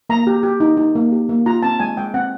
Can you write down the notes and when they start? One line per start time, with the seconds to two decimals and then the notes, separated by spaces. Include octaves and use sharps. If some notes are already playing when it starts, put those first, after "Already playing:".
0.10 A#3 A#5
0.27 G4
0.43 G4
0.60 D#4
0.77 D#4
0.95 A#3
1.12 G4
1.29 A#3
1.46 F4 A#5
1.63 C4 A5
1.80 G#3 G#5
1.97 G#3 G5
2.14 C4 F#5